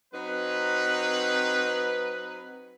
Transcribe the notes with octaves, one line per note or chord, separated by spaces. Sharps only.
F#3 C4 D#4 B4